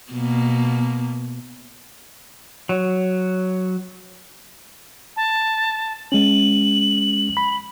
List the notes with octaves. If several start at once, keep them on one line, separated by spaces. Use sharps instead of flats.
B2 A#3
F#3
A5
G#3 C#4 F#7
B5